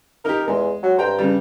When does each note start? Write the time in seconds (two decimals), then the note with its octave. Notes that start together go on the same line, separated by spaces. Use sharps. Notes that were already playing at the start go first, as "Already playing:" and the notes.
0.25 D#4 G4 A#4
0.48 E2 G#3
0.83 F#3
0.98 G2 C5 G5 A#5
1.19 C#3 G3